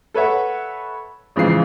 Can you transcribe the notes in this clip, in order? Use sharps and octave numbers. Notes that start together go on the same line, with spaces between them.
A4 B4 C#5 E5 F#5
A1 G#2 C#3 E3 F3 C7